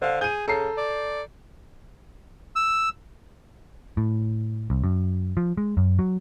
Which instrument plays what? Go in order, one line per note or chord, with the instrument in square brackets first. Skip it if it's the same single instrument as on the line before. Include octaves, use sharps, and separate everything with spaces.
[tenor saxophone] D3 [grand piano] C5 F5
[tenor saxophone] G#4 [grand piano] G6 D#7
[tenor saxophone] C#3 [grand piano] A4 A#5 C7
[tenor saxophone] D5
[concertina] E6
[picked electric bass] A2
C2
F#2
F3
G#3
F#2
F#3